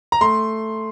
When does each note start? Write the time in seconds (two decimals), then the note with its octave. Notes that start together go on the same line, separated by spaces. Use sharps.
0.12 A#5
0.21 A3 C6